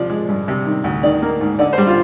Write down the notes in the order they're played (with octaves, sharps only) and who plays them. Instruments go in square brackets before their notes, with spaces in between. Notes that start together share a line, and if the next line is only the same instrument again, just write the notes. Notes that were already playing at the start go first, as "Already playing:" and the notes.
Already playing: [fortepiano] C3 F3 D5
G#3
G2
C3
D#3
D2
D#3 D5
A#3
G#2
D3 D5
C5
G3
F4